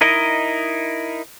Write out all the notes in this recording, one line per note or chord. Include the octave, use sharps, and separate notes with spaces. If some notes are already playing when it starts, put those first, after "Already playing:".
D#4 E4 A#4 D#5